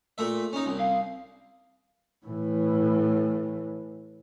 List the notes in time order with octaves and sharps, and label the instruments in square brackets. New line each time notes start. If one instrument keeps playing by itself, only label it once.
[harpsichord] A#2 A3 E5
C#4 D#4
C2
[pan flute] F5
[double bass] A2 E3